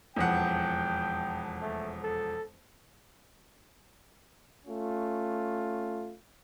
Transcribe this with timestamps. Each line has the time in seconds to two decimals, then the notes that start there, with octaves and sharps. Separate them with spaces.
0.16 E1 F2 F#5 G5
1.62 A3
2.03 A4
4.66 A3 C#4 F4